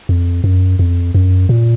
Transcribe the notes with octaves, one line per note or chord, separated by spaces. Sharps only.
F2
F#2
F2
F#2
A#2